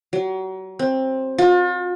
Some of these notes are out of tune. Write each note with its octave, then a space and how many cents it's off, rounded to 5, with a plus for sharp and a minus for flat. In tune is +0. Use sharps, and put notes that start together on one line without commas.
F#3 +35
C4 +15
F4 +40